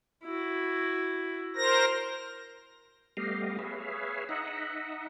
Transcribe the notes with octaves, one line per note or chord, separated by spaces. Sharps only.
E4 F#4
A#4 C5 A#6
G3 A3 B3 G4 D#5 F5
G#4 B4 C#5 E5 F5
D#4 D#5 E5 F#5